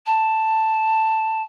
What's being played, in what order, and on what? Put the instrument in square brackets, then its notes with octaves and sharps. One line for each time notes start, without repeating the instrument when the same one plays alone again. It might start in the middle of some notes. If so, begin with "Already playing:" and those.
[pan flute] A5